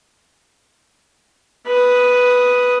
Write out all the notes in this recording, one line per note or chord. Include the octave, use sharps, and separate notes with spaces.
B4 D#6